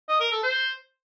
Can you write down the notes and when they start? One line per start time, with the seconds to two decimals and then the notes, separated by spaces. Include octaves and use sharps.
0.09 D#5
0.20 A#4
0.32 A4
0.43 C5